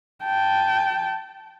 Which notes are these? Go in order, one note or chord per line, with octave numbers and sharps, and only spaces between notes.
G5 A5